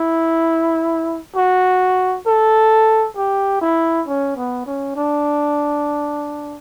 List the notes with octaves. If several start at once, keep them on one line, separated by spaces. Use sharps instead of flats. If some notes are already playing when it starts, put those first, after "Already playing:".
Already playing: E4
F#4
A4
G4
E4
C#4
B3
C#4
D4